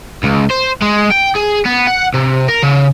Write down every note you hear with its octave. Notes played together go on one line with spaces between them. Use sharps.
C#2
C5
G#3
G5
G#4
B3
F#5
C3
A#4
C#3